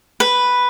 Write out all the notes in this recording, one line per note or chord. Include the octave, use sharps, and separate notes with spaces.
B4